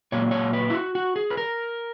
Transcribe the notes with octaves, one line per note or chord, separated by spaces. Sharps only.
A#2 F#3 A#3 C#5
C#5
B4
E4
F#4
F#4
G#4
B4
A#4